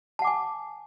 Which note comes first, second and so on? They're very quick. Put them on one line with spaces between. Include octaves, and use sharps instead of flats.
A5 F#5 D6 G#5